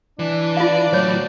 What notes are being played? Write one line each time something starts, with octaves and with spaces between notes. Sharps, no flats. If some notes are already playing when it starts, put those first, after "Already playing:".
E3 D4
F4 D5 F5
A2 F#3 C5 C#5